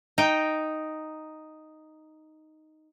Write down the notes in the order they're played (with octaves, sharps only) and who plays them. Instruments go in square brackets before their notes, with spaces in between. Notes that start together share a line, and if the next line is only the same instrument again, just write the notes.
[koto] D#4 G5